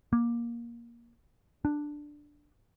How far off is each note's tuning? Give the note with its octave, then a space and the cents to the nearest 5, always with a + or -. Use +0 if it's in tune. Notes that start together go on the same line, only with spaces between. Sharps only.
A#3 +15
D4 +5